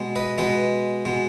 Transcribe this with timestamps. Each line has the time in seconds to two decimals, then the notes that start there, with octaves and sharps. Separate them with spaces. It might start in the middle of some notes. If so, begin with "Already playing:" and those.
Already playing: B2 G#3
0.16 B4 D#5
0.38 B2 G#3 B4 D#5
1.05 B2 G#3